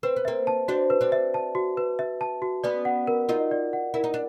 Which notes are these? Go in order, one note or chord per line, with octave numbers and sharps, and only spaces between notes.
C4 B4
B3
A#3 C4 E5
A5
C4 D4 F#4
B4
C4 D4
E5
A5
F#4
B4
E5
A5
F#4
B3 C#4 D5
F#5
A#4
D#4 F4 A#4
D5
F#5
E4 A#4
D#4
D4